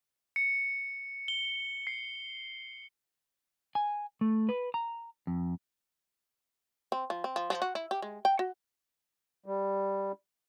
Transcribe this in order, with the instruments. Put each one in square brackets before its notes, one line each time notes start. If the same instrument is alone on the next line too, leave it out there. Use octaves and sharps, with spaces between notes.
[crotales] C#7
G7
C7
[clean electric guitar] G#5
A3
B4
A#5
F2
[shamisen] C4
F3
C4
F3
F3
F#4
E4
G4
G#3
G5
F#4
[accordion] G3